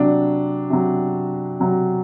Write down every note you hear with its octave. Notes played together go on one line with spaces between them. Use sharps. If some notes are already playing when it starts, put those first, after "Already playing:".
Already playing: C3 F#3 D4
C3 F#3
C3 F#3